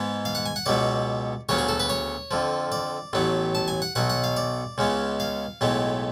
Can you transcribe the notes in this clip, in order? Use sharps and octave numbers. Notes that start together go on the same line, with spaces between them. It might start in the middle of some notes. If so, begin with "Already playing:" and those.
Already playing: G#2 G#3 B3
F5
F#5
G#5
F#5
C#2 B2 F#3 B3 D5
D2 C#3 F#3 B3 C#5
G#4
A4
B4
C#5
F2 D3 F3
D5
A1 A2 F#3 B3
A5
G#5
F#5
B1 B2 F#3 F#5
F#5
F5
D5
C#2 C#3 G#3 B3
F5
B1 A2 G#3 B3